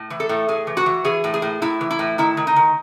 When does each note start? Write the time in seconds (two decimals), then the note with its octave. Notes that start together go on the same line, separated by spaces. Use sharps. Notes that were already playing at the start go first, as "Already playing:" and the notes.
Already playing: A2
0.10 E3
0.20 A4
0.29 A2
0.48 A2 G#4
0.67 E3
0.77 F#4
0.86 E3
1.05 E3 G#4
1.24 A2
1.34 G#4
1.42 A2
1.62 A2 E4
1.81 E3
1.91 E4
1.99 A2
2.18 D#3 E4
2.37 D#3
2.47 D#4
2.56 D#3